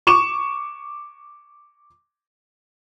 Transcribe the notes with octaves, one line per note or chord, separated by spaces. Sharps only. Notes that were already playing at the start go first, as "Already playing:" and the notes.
C#6 D6 E7